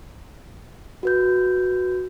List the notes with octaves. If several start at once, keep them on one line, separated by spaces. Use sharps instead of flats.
F#4 B4 G6